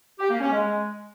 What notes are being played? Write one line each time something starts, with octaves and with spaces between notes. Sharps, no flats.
G4
A#3
C#4
G#3